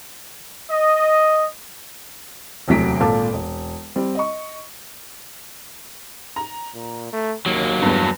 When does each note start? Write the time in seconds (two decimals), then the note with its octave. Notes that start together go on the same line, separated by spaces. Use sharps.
0.71 D#5
2.68 E1 D2 C3 F#3 B6 D7
3.00 G#1 A#2 A4 F5 A5 D6
3.33 E1
3.96 G3 C4
4.15 D#5 C#6
6.36 A#5
6.74 A#2
7.13 A3
7.46 D#2 F#3 A#3
7.82 E2 G2